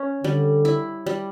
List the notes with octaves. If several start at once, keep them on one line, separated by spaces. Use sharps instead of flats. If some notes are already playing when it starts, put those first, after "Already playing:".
Already playing: C#4
D3 G3
E4
G3